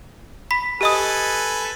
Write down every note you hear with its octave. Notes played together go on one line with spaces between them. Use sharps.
B5 B6
G4 A4 B4 D#5 G#5 D#6